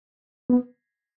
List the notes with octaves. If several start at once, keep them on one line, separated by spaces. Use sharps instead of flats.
B3